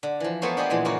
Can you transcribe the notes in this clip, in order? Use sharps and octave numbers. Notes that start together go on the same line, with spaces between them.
D3
E3 F3
A3 B3 A4 A#4 C5 C#5
D4 F4 G4 G#4 D#5
A#2 E3 F3 G#3
C#3 A#3 D#4 F4 F#4